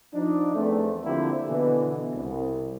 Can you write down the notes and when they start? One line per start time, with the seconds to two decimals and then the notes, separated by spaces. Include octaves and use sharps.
0.13 F3 D4 D#4
0.55 E2 A3 C4
1.04 D3 F3 A#3 C4 E4 G4
1.47 B2 D3 E3
2.14 C2